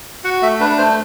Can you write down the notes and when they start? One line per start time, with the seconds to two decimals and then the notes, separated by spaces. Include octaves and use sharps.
0.24 F#4 F#5
0.42 A3 E5
0.60 D4 B4
0.78 A3 C5